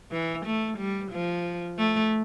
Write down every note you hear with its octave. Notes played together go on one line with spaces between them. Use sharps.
E3
A3
G3
F3
A3